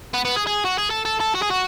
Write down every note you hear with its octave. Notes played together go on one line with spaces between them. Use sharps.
B3
B3
G#4
G#4
F#4
G#4
A4
A4
A4
F#4
G#4
F#4